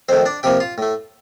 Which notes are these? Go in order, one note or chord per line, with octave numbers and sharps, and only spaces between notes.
F2 D#3 A3 C4 C5
D4 D5
C3 F3 A#3 G4 G5
F4 F5
A2 A3